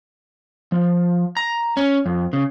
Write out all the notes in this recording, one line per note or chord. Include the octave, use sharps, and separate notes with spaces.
F3
A#5
C#4
F2
C#3